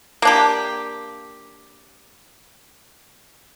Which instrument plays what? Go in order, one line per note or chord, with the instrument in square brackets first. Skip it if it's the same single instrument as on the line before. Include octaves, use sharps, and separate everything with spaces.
[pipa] A#3 D4 G4